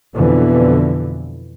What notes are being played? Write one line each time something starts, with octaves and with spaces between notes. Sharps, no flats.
F2 B2 D3 E3